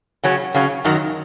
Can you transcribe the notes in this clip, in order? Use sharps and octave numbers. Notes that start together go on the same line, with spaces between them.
C#3 F#3 C#4
C#3 F#3 C#4
F#2 D#3 F#3